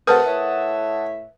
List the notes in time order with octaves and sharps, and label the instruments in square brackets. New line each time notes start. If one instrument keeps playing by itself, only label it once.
[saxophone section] C3 A3 [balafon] A#4 B4 [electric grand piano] F#5 A5 D#6
[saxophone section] A2 C#5 E5